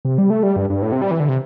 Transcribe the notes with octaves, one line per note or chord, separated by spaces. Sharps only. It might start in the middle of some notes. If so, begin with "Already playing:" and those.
C3
G3
A3
G3
G2
G2
A2
C3
G3
E3
D3
C3